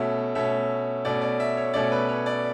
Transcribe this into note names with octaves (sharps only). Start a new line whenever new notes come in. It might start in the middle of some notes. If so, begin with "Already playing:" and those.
Already playing: B2 A3 C#4 E5
B2 A3 C#4 E5
B2 A3 C#4 D5
D5
E5
C#5
B2 A3 C#4 D5
B4
C#5
D5